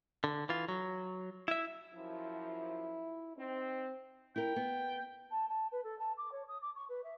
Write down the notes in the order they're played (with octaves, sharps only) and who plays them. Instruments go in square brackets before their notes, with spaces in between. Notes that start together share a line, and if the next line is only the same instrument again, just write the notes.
[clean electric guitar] D3
E3 F4
F#3
E4 E5
[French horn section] F#2 F3 [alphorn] E4
[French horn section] C4 [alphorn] D#4
[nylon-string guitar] E4 A#4 [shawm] G5
[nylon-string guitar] B3
[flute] A5
A5
B4
A4
A5
D6
C#5
D#6
D6
C#6
B4
E5